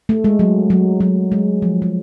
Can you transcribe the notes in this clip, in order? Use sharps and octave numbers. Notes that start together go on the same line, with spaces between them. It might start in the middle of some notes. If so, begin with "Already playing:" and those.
A3
G#3
F#3
F#3
F#3
G#3
F3
G#3